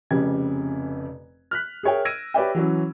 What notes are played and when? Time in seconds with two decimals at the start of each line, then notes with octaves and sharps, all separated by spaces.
0.11 F1 F2 C#3 G4 G#6
1.51 F6 F#6 B6
1.83 G#4 A#4 C#5 E5 G5
2.05 E6 G#6 A#6 D7 D#7
2.34 G4 B4 C#5 D5 E5 G5
2.55 E3 F#3 C#4